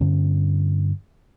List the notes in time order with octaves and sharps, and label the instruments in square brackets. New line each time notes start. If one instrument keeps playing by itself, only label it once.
[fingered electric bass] G2 D3 C#4